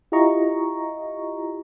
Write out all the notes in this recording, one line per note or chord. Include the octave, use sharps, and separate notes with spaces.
E4 F4 G4 D#5 A#5 C#6